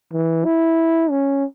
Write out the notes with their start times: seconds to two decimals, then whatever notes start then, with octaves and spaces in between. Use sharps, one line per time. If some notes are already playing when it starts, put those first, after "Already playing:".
0.13 E3
0.45 E4
1.10 C#4